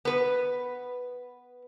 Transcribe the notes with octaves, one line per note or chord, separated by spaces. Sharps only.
B3 B4